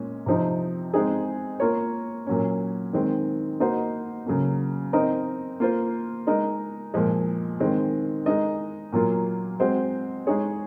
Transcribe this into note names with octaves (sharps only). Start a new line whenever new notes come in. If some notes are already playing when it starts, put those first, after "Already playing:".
Already playing: A#2 G#3 C#4
C3 F3 C4 D#4
G#3 C4 D#4 G#4
A#3 F4 A#4 C#5
A#2 F#3 C#4
D#3 G#3 C4
A#3 D#4 F#4 C5 D#5
C#3 F#3 A#3
C4 D#4 A#4 D#5
A#3 F4 C5
G#3 D#4 A#4 D#5
A#2 F3 G#3
D#3 G#3 C4
G#3 D#4 A#4 D#5
A#2 F#3 A#3 F4
G#3 C4 F#4 C5
G#3 D#4 G#4 C#5